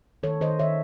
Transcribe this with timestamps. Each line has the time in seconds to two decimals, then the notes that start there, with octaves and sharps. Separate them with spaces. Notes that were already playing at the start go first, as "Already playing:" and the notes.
0.23 D#3 A4 C#5
0.41 D#3 C5 D#5
0.59 D#3 C#5 E5